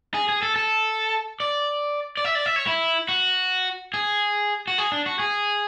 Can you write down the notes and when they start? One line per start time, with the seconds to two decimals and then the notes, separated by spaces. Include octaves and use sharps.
0.14 G#4
0.29 G#4
0.43 A4
0.56 A4
1.40 D5
2.17 D5
2.24 E5
2.35 D5
2.46 E5
2.56 C#5
2.67 E4
3.09 F#4
3.94 G#4
4.68 F#4
4.78 G#4
4.92 D4
5.06 F#4
5.19 G#4